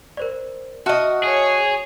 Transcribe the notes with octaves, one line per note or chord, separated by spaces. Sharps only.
A#4 C5 D5
F#4 D#5 E5 A5 F6
G#4 C#5